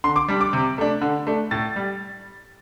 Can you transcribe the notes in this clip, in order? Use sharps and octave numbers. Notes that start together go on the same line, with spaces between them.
D3 C6
D6
G3 D4
D6
C3
A3 D4
D3
A3 D4
A2 A6
G3